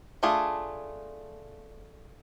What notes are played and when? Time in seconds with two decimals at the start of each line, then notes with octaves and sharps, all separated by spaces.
0.23 A3 D4 F4 G#4